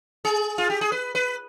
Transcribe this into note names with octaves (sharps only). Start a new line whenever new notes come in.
G#4
F4
G4
G#4
B4
B4